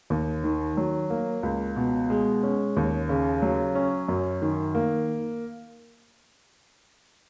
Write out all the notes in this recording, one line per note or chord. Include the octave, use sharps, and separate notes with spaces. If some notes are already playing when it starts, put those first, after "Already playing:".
D#2
D#3
F#3
A#3
C#2
B2
G#3
C#4
D#2
C#3
F#3
C#4
F#2
D#3
A#3